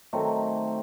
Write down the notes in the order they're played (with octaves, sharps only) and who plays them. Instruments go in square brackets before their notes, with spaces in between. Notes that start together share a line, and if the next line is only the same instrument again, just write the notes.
[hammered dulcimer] D#3 F#3 A3 C4